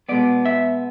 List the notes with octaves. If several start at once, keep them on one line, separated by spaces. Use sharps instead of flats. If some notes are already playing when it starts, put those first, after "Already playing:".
B2 G#3 B3 D5
E5